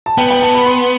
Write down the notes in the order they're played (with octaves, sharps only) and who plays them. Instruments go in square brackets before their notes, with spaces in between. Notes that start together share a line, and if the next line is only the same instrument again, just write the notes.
[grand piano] A5
[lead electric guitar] B3 [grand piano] G5
[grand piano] G5
A5
B5
C6